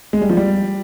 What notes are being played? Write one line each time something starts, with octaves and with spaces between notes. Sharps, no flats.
G#3
G3
F3
G3